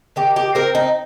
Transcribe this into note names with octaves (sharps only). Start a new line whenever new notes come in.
D#3 G4
G4
C4 A#4
D#4